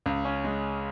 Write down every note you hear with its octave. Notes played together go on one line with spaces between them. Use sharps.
C#2
C#4
G#3